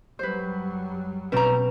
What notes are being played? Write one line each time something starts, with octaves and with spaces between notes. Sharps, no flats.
F#2 F#3 G3 B4 C5
B2 C4 C#4 B4 A#5 B5 E7